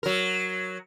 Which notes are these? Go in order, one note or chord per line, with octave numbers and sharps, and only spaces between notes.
F#3 A#4